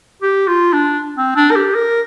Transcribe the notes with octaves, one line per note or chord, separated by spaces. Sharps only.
G4
F4
D4
C4
D4
A#4
G4
A#4